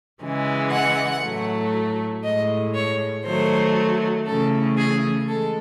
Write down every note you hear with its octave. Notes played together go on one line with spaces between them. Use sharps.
C#3 E3 G#3
F#5
A2 F#3 A3
A2 G#3 D#5
C#5
D#3 F#3 A3 C5
C#3 E3 A3 A4
G#4
E3 G#3 A4